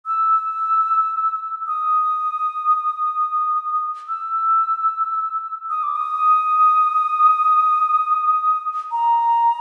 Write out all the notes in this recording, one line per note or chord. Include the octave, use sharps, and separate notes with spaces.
E6
D#6
E6
D#6
D6
D#6
A#5